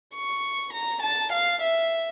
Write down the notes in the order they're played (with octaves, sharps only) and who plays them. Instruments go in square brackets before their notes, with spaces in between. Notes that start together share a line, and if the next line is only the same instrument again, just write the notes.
[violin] C#6
A#5
A5
F5
E5